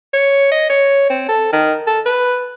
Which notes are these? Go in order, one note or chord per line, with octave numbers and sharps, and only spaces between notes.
C#5
D#5
C#5
C4
A4
D#3
A4
B4